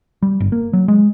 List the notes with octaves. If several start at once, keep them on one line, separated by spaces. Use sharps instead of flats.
G3
G1
A#3
F#3
G#3